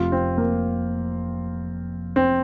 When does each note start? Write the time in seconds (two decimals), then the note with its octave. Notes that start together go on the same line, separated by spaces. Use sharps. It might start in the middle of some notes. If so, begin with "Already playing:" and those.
Already playing: F1 F2 C3 F4
0.12 C4
0.38 A#3
2.16 C4